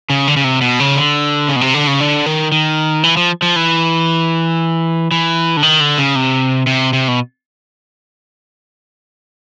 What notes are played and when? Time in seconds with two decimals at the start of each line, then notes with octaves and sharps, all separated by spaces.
0.10 C#3
0.28 D3
0.37 C#3
0.44 C3
0.61 B2
0.80 C#3
0.96 D3
1.49 C#3
1.56 B2
1.61 C3
1.74 D3
1.87 C#3
2.00 D3
2.26 D#3
2.52 D#3
3.03 E3
3.17 F3
3.42 F3
3.56 E3
5.11 E3
5.57 D3
5.63 D#3
5.80 D3
5.98 C#3
6.15 C3
6.67 C3
6.93 C3
7.08 B2